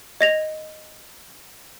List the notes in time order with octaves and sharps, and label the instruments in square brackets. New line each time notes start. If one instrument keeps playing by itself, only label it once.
[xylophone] D#5 A#6 F7